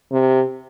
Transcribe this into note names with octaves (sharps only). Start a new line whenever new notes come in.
C3